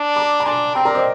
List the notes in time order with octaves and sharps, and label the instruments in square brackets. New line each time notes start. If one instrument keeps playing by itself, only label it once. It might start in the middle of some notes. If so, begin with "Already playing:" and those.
Already playing: [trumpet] D4
[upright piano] A#5 D6
A#5
[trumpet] D4 [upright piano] G#5 C6
[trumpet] C4 [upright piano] G5 A#5
[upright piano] A#4 D5
C5 D#5